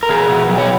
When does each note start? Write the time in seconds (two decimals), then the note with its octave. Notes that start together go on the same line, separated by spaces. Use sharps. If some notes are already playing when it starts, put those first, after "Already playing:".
0.03 A#4
0.09 B2 G#4
0.30 B2
0.49 F#3
0.58 C#5